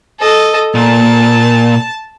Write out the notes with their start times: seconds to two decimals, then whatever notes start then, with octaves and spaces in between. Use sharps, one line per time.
0.20 A4 D#5
0.75 A#2 A5